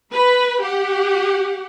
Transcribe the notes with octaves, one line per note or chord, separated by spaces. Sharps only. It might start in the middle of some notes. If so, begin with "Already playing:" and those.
B4 B5
G4 F#5